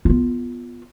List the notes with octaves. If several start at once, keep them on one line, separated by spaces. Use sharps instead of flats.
B3 F4